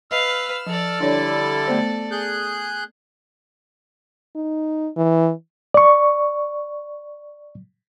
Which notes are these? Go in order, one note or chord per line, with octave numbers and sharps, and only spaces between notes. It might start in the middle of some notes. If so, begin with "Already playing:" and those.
B4 D#5 F5 E6 F6
F3 A4 D5
D3 G3 D4 E4 C#5
A3 B3 C5
G#4 F#6 G6
D#4
E3
D5 C#6